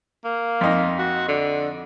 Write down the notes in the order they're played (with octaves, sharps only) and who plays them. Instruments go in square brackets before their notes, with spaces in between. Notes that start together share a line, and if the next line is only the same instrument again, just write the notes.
[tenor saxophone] A#3
[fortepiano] F2 D#4
[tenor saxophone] F#4
D3